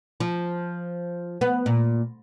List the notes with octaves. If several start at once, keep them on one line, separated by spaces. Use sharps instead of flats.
F3
B3
A#2